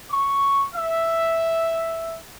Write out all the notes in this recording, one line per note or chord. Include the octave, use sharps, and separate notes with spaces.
C#6
E5